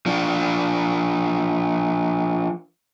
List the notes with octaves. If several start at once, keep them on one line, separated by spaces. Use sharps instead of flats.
F3 D4